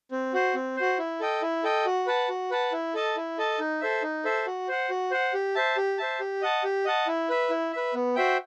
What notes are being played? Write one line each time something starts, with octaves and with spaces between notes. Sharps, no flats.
C4
F#4 C5
C4
F#4 C5
E4
A4 D#5 G5
E4
A4 D#5 G5
F#4
B4 F#5 A5
F#4
B4 F#5 A5
E4
A4 D#5 A5
E4
A4 D#5 A5
D#4
A4 C5 E5
D#4
A4 C5 E5
F#4
C5 F#5
F#4
C5 F#5
G4
C5 E5 A5
G4
C5 E5 A5
G4
D#5 F#5 A5
G4
D#5 F#5 A5
E4
B4 E5
E4
B4 E5
B3
F#4 C5 E5 G5